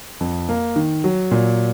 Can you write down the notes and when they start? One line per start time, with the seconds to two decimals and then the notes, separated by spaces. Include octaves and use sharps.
0.21 F2
0.49 A#3
0.76 D#3
1.04 F#3
1.31 A#2